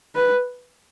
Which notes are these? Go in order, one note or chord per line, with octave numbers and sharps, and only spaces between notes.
B4